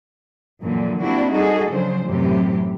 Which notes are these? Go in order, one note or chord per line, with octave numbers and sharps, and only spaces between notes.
F#2 A#2 D3 E3 F3
A#3 C4 D4 E4 F#4 G4
G3 D#4 F#4 G#4 A4 D#5
C#3 F3 F#3 D4 C5
F#2 A2 C3 E3 G4